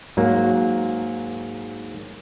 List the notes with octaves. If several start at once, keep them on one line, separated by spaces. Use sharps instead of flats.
G#2 F#3 A#3